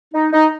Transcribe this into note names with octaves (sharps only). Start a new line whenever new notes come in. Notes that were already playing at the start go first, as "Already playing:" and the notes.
D#4
D#4